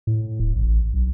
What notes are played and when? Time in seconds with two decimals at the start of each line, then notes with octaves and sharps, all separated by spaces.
0.07 A2
0.40 D1
0.56 A1
0.93 B1